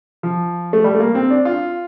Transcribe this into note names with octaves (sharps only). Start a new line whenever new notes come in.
F3
A3
G3
A3
A#3
C4
D4
F4